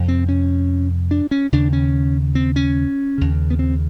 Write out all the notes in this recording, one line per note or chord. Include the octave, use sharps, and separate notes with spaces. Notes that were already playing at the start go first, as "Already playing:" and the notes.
Already playing: F2 C3
C4
C#4
D4
C#4
D#2 C#3 D4
C#4
C4
C#4
D#2 C#3
B3
C4